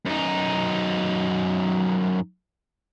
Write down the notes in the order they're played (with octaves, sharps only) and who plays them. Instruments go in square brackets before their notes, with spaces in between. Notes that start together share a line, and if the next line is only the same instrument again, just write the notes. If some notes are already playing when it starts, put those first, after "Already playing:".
[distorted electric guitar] F#2 D#4